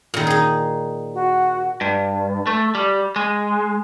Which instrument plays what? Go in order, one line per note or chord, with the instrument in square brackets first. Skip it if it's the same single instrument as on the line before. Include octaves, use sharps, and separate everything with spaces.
[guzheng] A#2 D#3
D#4 G#4
[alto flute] F#4
[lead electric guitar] G2
A3
G3
G#3